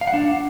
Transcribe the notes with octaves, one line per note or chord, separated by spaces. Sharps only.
F5
F#5
D4